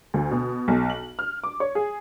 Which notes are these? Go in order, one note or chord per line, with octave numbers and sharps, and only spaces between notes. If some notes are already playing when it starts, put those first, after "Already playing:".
D2
B2
B1
F#7
F6
D6
C#5
G#4